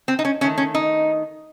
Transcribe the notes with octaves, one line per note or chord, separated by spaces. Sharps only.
C4
D#4
C#4
D#3 A3 C#4
C#4
D#4